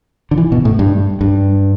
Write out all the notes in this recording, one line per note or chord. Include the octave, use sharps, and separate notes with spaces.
D3
E3
B2
A2
G2
G2